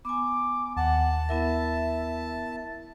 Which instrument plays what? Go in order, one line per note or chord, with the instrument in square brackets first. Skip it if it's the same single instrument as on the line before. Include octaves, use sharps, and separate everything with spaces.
[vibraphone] B3 G#5 [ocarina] D6
[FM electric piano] D#2 [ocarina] F#5 [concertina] A5
[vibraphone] B3 E4 A#4 [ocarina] E5